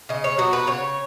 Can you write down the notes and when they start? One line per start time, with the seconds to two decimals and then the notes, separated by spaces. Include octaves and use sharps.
0.09 C#3 D#5
0.24 C#5
0.38 F#3 B3 F#4
0.53 B4
0.67 C#3 C#5